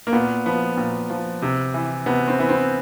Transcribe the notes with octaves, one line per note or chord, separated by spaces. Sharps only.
A#3
A#2 B3
F3 B3
A#2
F3
C3
E3
C3 B3
C4
E3 B3
C4